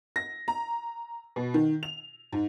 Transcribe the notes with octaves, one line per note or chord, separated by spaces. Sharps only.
A#6
A#5
B2
D#3
F7
G#2